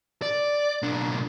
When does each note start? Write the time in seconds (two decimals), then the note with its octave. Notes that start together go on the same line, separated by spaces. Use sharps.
0.22 D5
0.82 B1 D4